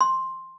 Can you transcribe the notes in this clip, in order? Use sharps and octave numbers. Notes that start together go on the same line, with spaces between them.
C6